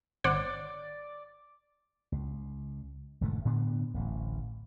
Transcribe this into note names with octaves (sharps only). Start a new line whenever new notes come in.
G#1 C5 D5 F#5
C#2
E1 G#2 D3 A3
A2 D3 B3 D4
D1 A1